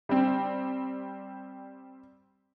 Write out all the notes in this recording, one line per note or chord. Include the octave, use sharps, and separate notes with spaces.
G3 C4